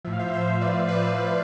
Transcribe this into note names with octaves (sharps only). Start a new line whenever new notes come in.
A2 F3 E5
F5
C5 E5
C5 E5
C5
B4 D5
B4 D5